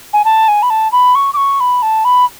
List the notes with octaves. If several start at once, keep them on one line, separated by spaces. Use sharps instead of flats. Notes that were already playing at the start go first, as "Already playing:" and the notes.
G#5
A5
G#5
B5
A5
B5
C#6
D6
C#6
B5
A5
B5